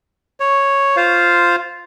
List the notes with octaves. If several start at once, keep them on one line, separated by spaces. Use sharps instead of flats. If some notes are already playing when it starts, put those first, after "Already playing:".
C#5
F4 C5 F5